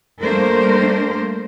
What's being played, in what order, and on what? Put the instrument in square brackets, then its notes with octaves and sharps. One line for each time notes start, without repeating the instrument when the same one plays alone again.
[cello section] G3 A3 A#3 D4 A#4 C5